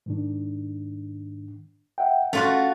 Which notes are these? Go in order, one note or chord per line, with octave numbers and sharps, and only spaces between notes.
G#2 D#3 D4
E5 F#5 G5
A3 C#4 F4 F#4 A4